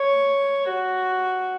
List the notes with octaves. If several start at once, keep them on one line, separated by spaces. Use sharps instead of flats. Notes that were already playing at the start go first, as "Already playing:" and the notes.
Already playing: C#5
F#4